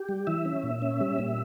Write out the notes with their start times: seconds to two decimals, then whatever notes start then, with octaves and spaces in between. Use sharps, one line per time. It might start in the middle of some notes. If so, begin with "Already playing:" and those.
Already playing: G4
0.09 G3
0.27 E3 E5
0.45 C#4
0.64 A#2
0.82 C#4
1.00 G3
1.19 A#2